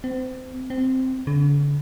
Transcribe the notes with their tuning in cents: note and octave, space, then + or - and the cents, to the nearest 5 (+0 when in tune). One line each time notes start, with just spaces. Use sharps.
C4 -30
C4 -5
D3 -40